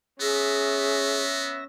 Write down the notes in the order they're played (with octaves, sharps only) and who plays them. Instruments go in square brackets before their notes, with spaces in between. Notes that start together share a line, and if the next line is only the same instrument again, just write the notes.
[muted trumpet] B3 [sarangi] C#4 [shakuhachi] G#4 [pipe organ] E5 A#6